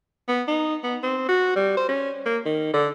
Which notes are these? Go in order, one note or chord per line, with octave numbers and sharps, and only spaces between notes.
B3
D#4
B3
C4
F#4
G3
C5
C#4
A#3
D#3
D3